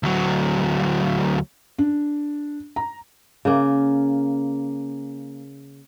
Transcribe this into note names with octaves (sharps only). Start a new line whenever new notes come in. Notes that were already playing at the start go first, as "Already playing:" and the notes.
D2 F#3
D4
A#5
C#3 A#3